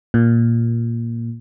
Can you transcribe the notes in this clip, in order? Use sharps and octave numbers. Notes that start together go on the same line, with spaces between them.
A#2